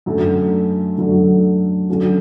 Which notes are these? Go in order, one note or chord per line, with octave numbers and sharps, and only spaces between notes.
F#2 D3 F#3 A3
F#2 D3 F#3 A3
D3 F#3 A3 C#4 F#4